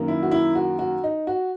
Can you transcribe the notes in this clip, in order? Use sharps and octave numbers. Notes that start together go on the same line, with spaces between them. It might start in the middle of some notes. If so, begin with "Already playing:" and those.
Already playing: F#2 D#3 A#3
E4
F#4
E4
F#4
F#4
D#4
F#4